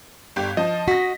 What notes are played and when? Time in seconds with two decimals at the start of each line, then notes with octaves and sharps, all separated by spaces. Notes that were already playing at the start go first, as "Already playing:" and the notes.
0.36 G1 G4
0.57 F3 D#5 A5
0.88 F#4 A#6 B6